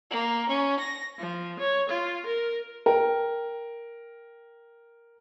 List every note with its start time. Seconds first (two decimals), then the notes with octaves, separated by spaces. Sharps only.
0.11 A#3
0.48 C#4
0.80 A#6
1.19 F3
1.59 C#5
1.89 F4
2.25 A#4
2.86 A#4 G5